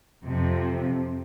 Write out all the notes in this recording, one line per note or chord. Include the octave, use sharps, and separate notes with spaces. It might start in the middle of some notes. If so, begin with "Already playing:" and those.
F2 C3 F3